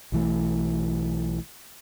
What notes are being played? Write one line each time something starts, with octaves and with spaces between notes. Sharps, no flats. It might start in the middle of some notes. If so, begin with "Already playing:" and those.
B1 E3 A3